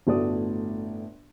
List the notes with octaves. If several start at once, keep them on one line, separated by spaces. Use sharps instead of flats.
G1 A2 A3 F#4 D5 D#6